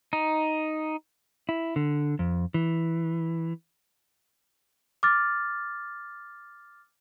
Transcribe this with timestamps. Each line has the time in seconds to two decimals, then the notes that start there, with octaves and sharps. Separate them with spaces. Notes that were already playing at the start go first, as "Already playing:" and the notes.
0.13 D#4
1.49 E4
1.76 D3
2.19 F2
2.54 E3
5.03 D6 F6 A6